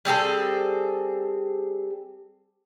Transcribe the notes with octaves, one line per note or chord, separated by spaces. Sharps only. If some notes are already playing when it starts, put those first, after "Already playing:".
G3 C4 G#4 A4